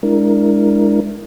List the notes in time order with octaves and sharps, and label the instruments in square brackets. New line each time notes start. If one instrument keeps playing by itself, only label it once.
[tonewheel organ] G#3 D4 E4 A#4